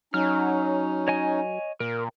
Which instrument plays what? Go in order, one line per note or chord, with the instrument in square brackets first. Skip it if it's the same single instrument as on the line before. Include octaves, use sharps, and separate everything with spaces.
[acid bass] F#3 [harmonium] C#4 D#4 [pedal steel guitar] F6
[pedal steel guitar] C#5 D#5 G#5
[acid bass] A#2 [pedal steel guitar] A#4